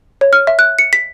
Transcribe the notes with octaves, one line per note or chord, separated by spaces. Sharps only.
C#5
F6
E5
F#6
C#7
B6